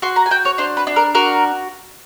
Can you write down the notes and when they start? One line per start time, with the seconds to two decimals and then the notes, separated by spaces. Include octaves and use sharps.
0.02 F#4 C6
0.16 A#5
0.26 G#5
0.31 F#4 G5
0.45 C#5
0.58 D4 C5
0.77 B4
0.87 D4
0.96 A#4
1.15 F#4 A#4